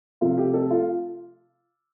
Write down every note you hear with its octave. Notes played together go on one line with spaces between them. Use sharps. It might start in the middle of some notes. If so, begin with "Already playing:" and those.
C3 F3 A3 F4
G4
A4
F4